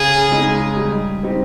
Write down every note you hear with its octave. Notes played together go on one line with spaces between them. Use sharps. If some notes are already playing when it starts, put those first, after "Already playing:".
Already playing: C#3 G#4
G#3 D#4
G3
C4 D#4 G4